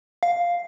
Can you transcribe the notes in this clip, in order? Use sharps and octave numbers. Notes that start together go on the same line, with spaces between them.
F5